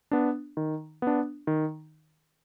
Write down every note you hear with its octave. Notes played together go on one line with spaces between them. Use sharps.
B3 D4
D#3
B3 D4
D#3